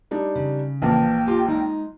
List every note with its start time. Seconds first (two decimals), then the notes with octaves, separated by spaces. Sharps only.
0.11 G3 D4 D#4
0.35 C#3
0.82 A#1 E3 A#3 G5 A5
1.27 F4 G4 G#5
1.48 G#3 D#4